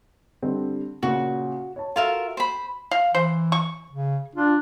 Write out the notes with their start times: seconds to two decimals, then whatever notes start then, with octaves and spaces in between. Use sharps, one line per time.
0.42 D3 G3 C4
1.03 A#2 C#3 F#4
1.76 C#5 A5
1.96 F4 F#4 A4 A#4 E5
2.37 C5 B5
2.91 F5
3.15 E3 C5
3.52 C#6
3.92 C#3
4.35 D4 F4